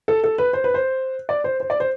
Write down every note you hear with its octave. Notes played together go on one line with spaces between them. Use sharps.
A4
A4
B4
C5
B4
C5
D5
C5
C5
D5
C5